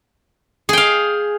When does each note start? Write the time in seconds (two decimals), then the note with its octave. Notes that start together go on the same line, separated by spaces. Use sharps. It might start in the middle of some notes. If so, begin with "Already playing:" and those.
0.69 G#4
0.73 G5
0.77 F5